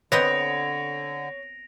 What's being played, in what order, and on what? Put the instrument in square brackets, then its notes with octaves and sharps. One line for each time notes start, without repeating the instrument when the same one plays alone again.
[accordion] D3 [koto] B3 C4 D#5 [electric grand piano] C#5 [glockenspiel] A#6 D7 F7